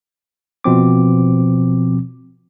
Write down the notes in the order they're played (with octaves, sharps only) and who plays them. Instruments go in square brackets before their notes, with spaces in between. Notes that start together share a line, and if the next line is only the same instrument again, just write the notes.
[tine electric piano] B2 F3 C4 D6